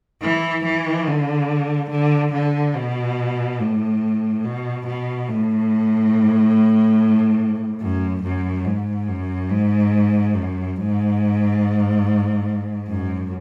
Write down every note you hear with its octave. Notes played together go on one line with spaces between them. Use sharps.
E3
E3
D3
D3
D3
B2
A2
B2
B2
A2
F#2
F#2
G#2
F#2
G#2
F#2
G#2
F#2